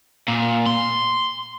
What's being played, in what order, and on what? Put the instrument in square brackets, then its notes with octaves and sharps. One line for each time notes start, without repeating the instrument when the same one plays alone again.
[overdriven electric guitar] A#2
C6